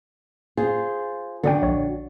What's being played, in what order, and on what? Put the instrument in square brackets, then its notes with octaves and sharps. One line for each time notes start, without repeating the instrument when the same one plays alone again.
[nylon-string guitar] F4 G#4 C5
[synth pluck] D3 D5 G5 [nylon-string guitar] D4 F#4
[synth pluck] A#1 C#5